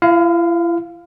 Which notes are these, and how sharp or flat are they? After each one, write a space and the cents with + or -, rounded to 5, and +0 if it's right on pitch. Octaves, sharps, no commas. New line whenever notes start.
E4 +45 F5 +0